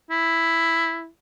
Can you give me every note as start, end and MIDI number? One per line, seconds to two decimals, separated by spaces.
0.10 1.07 64